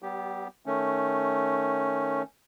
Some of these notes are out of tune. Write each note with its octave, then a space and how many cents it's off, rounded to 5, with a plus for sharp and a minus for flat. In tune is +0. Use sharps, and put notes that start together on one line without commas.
G3 -40 B3 +0 G4 +0
D#3 +0 A3 +0 C#4 +0